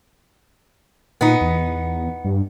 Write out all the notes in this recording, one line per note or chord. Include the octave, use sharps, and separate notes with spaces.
A#2 B3 D#4
E2
G2